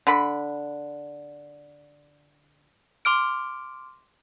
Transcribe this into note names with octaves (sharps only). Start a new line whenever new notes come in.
D3 B5
C6 D6 F6 D7